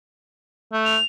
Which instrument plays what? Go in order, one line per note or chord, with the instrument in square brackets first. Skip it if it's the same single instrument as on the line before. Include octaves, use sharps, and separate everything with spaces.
[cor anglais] A3
[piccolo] F7